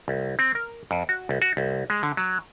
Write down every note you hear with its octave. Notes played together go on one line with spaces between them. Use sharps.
C2
C4
A#4
F2
F#4
C2
F#4
C2
G#3
D3
F#3